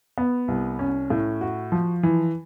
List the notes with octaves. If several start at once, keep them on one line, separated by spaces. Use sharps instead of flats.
B3
C2
C#4
A2
F#4
F3
E3